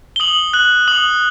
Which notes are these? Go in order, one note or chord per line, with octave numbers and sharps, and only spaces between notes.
G7
D#6 F#7
F#6 F#7
D#6 F#7